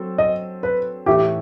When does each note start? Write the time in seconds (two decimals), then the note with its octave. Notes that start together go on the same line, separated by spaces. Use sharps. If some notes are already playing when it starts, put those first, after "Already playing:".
Already playing: F#3 C4 A4
0.18 D#5
0.63 B4
1.06 A2 E3 A3 E4 G4